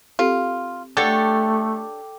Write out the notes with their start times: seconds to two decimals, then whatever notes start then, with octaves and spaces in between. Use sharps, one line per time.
0.19 C4 F4 G4 A4
0.97 A3 D4 G4 A4 C#5 F#5